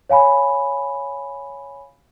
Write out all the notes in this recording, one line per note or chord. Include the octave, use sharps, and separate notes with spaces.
C#5 F5 G#5 B5